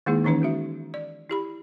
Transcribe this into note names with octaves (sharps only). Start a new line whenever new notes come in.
D#3 G#3 A#3 D#4 E4 G#4
D#3 E3 C#4 D#4 B4
G#3 F#4 E5
D5
E4 G4 B5